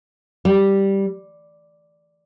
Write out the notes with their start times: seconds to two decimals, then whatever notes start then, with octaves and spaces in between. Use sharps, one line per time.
0.45 G3